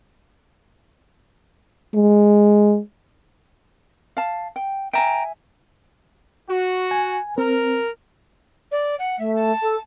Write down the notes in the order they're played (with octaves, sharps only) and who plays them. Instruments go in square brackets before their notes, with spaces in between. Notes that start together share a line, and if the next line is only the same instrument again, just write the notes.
[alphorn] G#3
[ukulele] F5 A5
G5
[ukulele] E5 G#5 [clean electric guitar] G5 A#5
[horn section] F#4
[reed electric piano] G#5
[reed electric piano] C4 [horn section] A#4
[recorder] D5
F#5
[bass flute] A3 [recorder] E5
[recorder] A5
[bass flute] A4